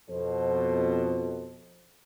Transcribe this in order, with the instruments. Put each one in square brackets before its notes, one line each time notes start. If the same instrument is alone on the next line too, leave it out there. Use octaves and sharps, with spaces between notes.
[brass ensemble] F2 B2 A4 C5